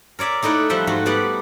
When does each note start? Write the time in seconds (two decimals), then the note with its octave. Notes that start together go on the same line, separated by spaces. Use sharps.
0.19 A#4 C#5 D5 E5 A#5
0.43 A3 D#4 E4 D5 F#5
0.69 F3 G3 E5 F#5 G5
0.87 G#2 A3 F#4
1.06 G3 B3 G4 B4 D5 F#5